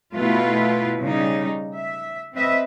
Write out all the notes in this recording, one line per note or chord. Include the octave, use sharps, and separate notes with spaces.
B2 A3 E4 F4 B4
C#3 G3 D#4
E5
C4 B4 D#5 E5